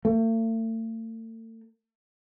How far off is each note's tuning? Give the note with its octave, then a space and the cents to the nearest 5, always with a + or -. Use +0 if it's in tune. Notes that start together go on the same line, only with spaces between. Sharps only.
A3 +40